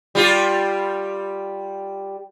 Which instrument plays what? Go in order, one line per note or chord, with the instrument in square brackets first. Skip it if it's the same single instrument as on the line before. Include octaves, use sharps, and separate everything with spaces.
[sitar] G3 F4 G4